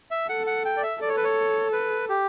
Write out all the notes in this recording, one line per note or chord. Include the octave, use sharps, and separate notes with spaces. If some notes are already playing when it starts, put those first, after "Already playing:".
E5
A4 F#5
F#5
G5
D5
E5
A4 D5
C#5
B4
C#5
B4
G4